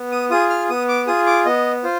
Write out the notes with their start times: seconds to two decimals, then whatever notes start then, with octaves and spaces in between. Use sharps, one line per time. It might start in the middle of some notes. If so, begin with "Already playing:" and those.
Already playing: B3
0.12 D#6
0.30 F4 G#4 D#6
0.50 F6
0.70 B3 D#6
0.89 D6
1.07 F4 G#4 D#6
1.27 D6
1.45 B3 D#5
1.84 F4 C5